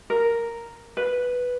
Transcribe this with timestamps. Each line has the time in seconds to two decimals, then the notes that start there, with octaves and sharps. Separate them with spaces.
0.10 A#4
0.97 B4